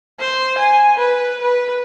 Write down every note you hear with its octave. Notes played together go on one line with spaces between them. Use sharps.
C5
G#5
B4
B4